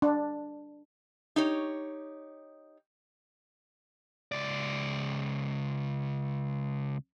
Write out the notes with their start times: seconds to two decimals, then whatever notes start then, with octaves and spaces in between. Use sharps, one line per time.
0.02 D4
1.36 D#4 G4 C#5
4.32 C#2 D5